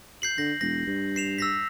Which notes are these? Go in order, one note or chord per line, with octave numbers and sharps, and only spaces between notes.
G6 C7 F#7
D3 A#6
E1 A#6
G2
C7 E7 F7
E6 A#6 B6